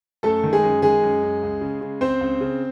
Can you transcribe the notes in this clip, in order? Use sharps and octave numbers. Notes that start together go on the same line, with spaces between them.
F#2 A3 A4
D#3
G#3 G#4
F#2
D#3 G#3 G#4
F#2
F#2
C#2
C#3
C#3
C#2 C4 C5
C#2
C#3